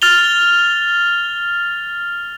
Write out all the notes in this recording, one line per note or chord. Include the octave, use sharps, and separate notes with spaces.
F6 A6 F7 G7